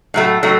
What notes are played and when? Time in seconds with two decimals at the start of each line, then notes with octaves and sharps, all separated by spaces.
0.14 A2 F#3 A3
0.43 A2 F#3 A3